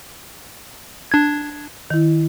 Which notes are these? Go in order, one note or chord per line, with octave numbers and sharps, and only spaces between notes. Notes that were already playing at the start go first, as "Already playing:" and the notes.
D4 G#6
D#3 E4